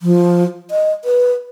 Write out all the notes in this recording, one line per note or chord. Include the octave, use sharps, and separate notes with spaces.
F3
D#5
B4